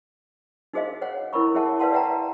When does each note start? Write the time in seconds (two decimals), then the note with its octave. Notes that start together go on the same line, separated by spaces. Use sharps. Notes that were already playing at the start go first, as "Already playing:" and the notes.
0.74 D#4 F#4 G#4 C5 D#5 F5
1.02 C5 C#5 F#5
1.33 E4 A#4 C#5 B5 C#6
1.55 G#4 C#5 E5 F#5 A5
1.79 B4 D5 F5 F#5 A5 C6
1.92 B4 D5 E5 F#5 G5 A#5